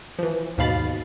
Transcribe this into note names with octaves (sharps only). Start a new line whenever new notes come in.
E3 F3
D#2 G#2 B2 F5 B5 A6